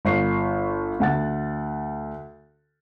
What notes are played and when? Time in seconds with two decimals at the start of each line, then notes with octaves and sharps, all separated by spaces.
0.05 G1 C#6 C7
1.00 D2 F#5 A6